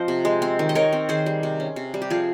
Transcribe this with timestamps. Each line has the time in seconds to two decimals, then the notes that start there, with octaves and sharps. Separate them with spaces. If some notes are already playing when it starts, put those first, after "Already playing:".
Already playing: F3 C4 C5 D#5
0.08 C3
0.25 G#3
0.42 C4
0.59 D#3
0.69 D#5
0.75 D#3 A#4 C#5
0.93 C4
1.09 D#3 G#4 C5
1.26 G3
1.43 C3
1.60 C#4
1.76 C3
1.94 G3
2.02 G4
2.10 F3 F4 G#4